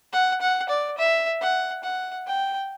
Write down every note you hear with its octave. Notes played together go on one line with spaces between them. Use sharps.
F#5
F#5
D5
E5
F#5
F#5
G5